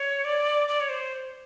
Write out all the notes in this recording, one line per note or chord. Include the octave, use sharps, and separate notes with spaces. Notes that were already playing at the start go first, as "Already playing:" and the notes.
Already playing: C#5
D5
D5
C#5
C5